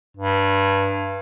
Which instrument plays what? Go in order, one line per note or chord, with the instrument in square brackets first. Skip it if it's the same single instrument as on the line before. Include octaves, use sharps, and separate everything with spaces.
[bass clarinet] G2